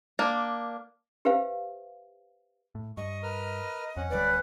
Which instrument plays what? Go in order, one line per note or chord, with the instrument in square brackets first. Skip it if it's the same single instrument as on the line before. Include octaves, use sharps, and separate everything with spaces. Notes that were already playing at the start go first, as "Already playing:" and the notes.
[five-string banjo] A#3 D4
[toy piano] G4 B4 C5 E5 F5
[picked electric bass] A2
[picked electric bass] G2 [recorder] D#5 [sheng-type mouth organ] C#6
[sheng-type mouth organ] A#4 B4 F6
[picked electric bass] F2 [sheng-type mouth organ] C#4 F#5
[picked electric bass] D1 D2 G3 [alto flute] B4 [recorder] D5